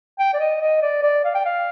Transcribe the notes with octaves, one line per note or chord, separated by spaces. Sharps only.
G5
D5
D#5
D#5
D5
D5
F5
G5
F5